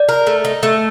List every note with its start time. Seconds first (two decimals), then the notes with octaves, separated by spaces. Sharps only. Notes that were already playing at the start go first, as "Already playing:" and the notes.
Already playing: D5
0.09 A#4
0.27 A3
0.45 D#4
0.63 A3